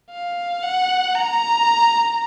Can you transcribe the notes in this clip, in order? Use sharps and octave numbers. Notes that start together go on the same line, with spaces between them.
F5
F#5
A#5